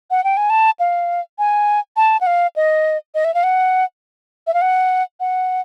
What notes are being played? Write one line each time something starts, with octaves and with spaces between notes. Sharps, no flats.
F#5
G5
G#5
A5
F5
G#5
A5
F#5
F5
D#5
D#5
E5
F5
F#5
E5
F5
F#5
F#5